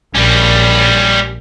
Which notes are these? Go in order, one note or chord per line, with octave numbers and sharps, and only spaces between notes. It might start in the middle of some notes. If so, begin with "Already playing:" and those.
A#1 G3 C#4